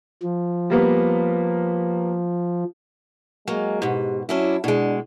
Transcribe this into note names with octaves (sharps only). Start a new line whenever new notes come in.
F3
G3 A#3 B3
F#3 G#3 A#3
G#2 B2 G4
F#3 C#4 D4 E4
B2 G#3 D4